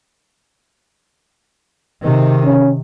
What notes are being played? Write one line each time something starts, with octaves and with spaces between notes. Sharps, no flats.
C3 D#3
C#4